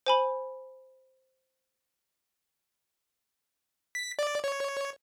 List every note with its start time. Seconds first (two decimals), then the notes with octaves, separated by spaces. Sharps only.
0.06 C5 G#5 B5
3.95 B6
4.19 D5
4.44 C#5